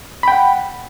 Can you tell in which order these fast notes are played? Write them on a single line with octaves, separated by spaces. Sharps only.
B5 G5 F#5